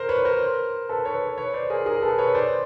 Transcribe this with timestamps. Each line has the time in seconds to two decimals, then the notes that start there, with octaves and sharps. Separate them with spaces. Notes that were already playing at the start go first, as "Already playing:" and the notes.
Already playing: A#4 C5
0.09 B4 C#5
0.25 A#4 C5
0.89 A4 B4
1.05 B4 C#5
1.38 B4 C#5
1.54 C5 D5
1.70 G#4 A#4
1.86 G#4 A#4
2.02 A4 B4
2.18 B4 C#5
2.35 C5 D5